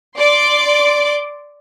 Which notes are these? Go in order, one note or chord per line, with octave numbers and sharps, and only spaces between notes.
D5 C6 D6